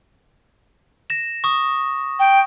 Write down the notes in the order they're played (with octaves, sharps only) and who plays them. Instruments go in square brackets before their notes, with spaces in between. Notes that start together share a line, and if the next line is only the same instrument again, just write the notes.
[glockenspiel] A#6 E7
C#6 D#6
[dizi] G5